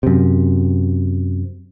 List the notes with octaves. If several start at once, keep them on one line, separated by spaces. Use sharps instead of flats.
F#2 C3